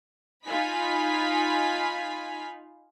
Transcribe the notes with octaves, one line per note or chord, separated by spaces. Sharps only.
D#4 F4 F5 G#5 B5 B6